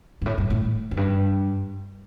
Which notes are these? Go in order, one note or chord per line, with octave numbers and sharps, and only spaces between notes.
G2
A2
G2
A2
F2
G2